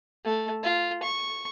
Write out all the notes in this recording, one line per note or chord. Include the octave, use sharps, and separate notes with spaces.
A3
F4
C#6